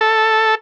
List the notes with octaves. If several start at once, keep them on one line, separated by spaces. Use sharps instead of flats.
A4